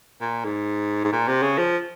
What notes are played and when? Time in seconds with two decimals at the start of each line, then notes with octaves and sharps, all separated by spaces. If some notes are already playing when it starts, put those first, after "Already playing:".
0.21 A#2
0.44 G#2
1.04 G#2
1.13 A#2
1.28 C3
1.42 C#3
1.58 F3